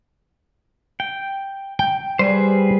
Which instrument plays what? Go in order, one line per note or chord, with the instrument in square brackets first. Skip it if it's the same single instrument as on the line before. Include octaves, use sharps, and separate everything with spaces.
[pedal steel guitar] G5
[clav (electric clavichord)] G5
[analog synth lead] G3 [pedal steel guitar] G#4 B4 C5